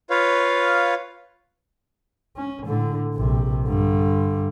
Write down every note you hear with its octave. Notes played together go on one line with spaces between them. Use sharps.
F4 B4 C#5 F5
C#4
A2 D3
A#1 C3
G2 D3